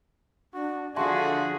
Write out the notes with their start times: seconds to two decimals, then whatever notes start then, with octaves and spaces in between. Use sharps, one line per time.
0.54 D4 F#4
0.96 D3 F3 F#4 G#4 E5 F5 A5 C6